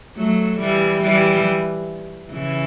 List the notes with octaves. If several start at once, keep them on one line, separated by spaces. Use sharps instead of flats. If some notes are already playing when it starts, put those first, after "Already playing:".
F#3 A3
E3 G3
E3 G3
C#3 E3